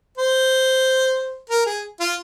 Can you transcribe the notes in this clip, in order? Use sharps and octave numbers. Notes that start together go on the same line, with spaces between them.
C5
A#4
G#4
F4